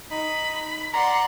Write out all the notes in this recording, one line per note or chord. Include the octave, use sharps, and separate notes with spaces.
D#4 B5
D5 F#5 A#5 C6